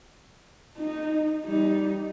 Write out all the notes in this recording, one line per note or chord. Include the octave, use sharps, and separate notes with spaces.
D#4
G3 D#4